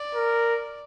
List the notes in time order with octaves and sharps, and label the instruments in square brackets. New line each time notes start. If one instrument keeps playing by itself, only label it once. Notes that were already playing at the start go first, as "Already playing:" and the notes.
Already playing: [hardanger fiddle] D5
[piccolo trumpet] A#4